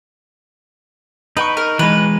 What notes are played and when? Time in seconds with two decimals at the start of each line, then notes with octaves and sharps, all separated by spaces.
1.37 D#4 B4 G5 C#6
1.57 A#4
1.79 E3 G#3 B4